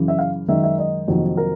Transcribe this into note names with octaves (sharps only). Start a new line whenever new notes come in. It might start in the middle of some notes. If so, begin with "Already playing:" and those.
Already playing: F#2 C#3 E3
E5
F5
F#2 D#3 G#3 E5
E5
D#5
F2 C3 D#3 F#3 A#3
A#4